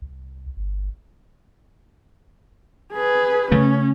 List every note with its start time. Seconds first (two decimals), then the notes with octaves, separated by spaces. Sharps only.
0.02 C2
0.57 G1
2.93 G#4 B4
3.52 C#3 A3 C#4